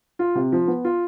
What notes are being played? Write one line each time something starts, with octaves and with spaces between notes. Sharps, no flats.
F4
C3
F3
B3
F4